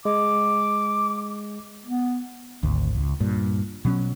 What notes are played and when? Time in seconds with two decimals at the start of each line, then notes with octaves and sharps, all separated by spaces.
0.05 G#3 D6
1.86 B3
2.63 G#1 D2
2.95 C#2
3.20 G2 A#2
3.85 B2 F#3 C#4